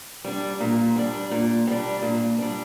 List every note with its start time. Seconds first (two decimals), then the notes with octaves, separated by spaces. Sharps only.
0.25 G3 D4
0.60 A#2
0.96 G3 D4
1.31 A#2
1.67 G3 D4
2.02 A#2
2.38 G3 D4